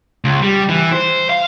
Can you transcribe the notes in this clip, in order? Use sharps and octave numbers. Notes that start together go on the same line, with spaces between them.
C#2
G3
E3
C5
F5